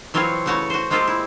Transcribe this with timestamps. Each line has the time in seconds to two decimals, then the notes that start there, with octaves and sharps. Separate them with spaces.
0.14 E3 F#3 C4 F4 C#5 F5
0.46 C#3 E3 A3 F#4 C#5
0.70 F#4 C5
0.90 G#3 A#3 C4 F4 G4 A4
1.08 E4